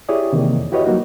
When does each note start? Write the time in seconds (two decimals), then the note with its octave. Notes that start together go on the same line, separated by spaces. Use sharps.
0.09 E4 G4 G#4 C#5 D5 D#6
0.33 C3 D#3 E3 A#3
0.57 F2
0.72 E4 F#4 G4 B4 C#5 D#5
0.86 F#3 G3 A#3 D#4 F#4